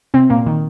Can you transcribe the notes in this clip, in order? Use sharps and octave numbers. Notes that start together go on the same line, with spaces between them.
C3 C4
A#2 A#3
D#3